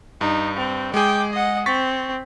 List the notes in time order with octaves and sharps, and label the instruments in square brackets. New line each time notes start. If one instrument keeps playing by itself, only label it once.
[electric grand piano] G2 [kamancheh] D#4
[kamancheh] C4
[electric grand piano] G#3 G#4 [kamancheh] G5 D6
[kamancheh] D#5 F#5
[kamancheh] C4 [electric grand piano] C#6 A6 B6